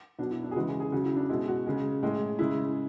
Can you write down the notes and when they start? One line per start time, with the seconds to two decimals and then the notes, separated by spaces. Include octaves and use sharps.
0.19 B2 D4
0.23 F#3
0.31 E4
0.43 D4
0.51 G#4
0.56 C#3 E3 G#3 F#4
0.68 G#4
0.80 G#4
0.92 C#3 F#4
0.95 F#3
1.05 E4
1.16 D4
1.29 B2 G#3 E4
1.48 F#4
1.66 C#3 G#3
2.03 A2 G#3
2.39 C#3 G#3 E4